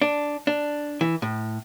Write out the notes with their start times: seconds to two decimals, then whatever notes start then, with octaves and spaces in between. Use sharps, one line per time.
0.02 D4
0.47 D4
1.01 E3
1.22 A2